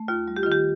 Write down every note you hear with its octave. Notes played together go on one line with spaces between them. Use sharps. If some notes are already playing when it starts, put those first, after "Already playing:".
Already playing: A3
D#2 F4
G3
G4
F4
D#3
G4